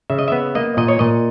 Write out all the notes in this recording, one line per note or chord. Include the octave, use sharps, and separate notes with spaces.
C#3 E5
D#5
B3 E5
A#3 D#5
A#2 D#5
C#5
A#2 D#5